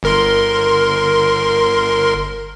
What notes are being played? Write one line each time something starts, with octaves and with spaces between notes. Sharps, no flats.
G1 A#4 C6